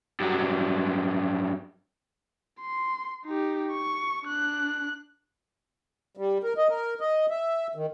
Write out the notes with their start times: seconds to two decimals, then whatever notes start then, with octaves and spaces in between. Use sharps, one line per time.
0.20 G2 F#3
2.60 C6
3.25 D#4 G4
3.72 C#6
4.24 D4 F#6
6.17 G3
6.43 A#4
6.57 D#5
6.70 A#4
7.01 D#5
7.30 E5
7.75 D#3